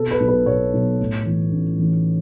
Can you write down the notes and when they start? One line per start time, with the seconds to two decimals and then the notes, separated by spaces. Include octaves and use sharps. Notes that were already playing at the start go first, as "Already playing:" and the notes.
Already playing: B2 A4
0.11 B4
0.20 B1
0.28 B4
0.46 B1 C#5
0.73 B1
1.00 A2
1.26 E3
1.53 A1
1.79 E3